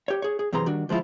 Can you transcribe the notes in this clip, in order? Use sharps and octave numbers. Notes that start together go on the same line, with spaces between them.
G4 C#5
G#4 C#5
G#4
F#2 C3 E3 G#4 A#5 C6
D#3 G3 D4 F#4
D2 F3 G#3 E4 F4